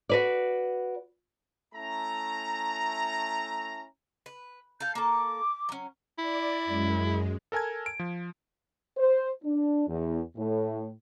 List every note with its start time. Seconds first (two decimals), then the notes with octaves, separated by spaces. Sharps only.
0.09 F#4 B4 D5
1.74 A3 C#4 E4 A5 A#5
4.26 B4
4.80 A4 F5 G6
4.95 A#3 A4 D6
5.69 F#3 C#4
6.18 E4 D5
6.65 F#2 G#3
7.52 A4 A#4 G#5 A5 G#6
7.86 D7
7.99 F3
8.97 C5
9.44 D4
9.88 E2
10.37 A2